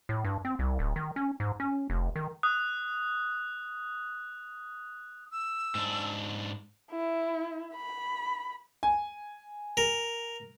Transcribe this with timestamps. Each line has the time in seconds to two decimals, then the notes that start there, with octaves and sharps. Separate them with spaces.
0.09 A2
0.24 G2
0.45 C4
0.59 C2
0.79 D1
0.96 D#3
1.16 C#4
1.40 G#2
1.60 C#4
1.90 F1
2.16 D#3
2.43 D#6 F#6
5.32 E6
5.75 G#2 D4
6.91 E4
7.74 B5
8.83 G#5
9.77 A#4